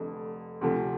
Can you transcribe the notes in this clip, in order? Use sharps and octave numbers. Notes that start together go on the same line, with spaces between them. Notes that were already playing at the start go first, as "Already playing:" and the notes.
Already playing: F1 F2 D3 A3
D2 C3 F3 A3